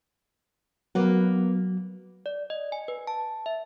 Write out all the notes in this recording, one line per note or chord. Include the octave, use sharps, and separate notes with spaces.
F#3 A#3 B3
D5
D#5
G#5
B4
A5
E5